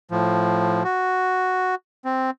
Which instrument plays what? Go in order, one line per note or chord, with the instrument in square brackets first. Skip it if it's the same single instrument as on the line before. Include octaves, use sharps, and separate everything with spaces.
[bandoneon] A2 F3
F#4
C4